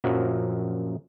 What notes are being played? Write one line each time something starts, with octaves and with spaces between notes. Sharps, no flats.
A#1 F#2 F3 F#3 A#3